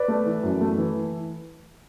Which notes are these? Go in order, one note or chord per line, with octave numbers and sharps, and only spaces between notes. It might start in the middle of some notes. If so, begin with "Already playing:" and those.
Already playing: B4 D5
A3
E3
F#2
A3
E3